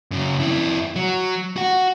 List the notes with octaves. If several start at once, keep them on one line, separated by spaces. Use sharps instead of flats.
F#2 C#3
F2 E4
F#3
F#4 F#5